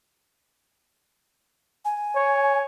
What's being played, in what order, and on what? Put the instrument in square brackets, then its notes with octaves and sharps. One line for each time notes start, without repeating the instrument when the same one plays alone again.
[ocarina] G#5
[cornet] C#5